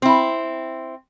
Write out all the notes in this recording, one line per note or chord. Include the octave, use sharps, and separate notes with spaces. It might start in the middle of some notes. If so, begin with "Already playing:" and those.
C4 E4